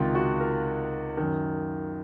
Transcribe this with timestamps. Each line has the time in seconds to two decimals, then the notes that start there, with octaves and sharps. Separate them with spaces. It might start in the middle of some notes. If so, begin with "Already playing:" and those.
Already playing: C#2 C3 D#3 F4
0.15 F#4
0.40 A#4
1.17 F#2 D#3